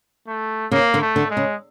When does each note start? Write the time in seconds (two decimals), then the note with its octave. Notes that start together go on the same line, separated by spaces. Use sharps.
0.27 A3
0.71 C#3 A#3
0.94 D3
1.01 A3
1.16 D3
1.30 G#3
1.37 C#3